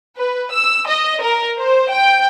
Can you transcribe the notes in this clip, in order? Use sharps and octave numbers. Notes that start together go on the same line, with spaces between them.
B4
E6
D#5
A#4
C5
G5